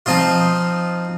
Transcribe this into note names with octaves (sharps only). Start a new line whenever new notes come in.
F3 C4 D#4 F4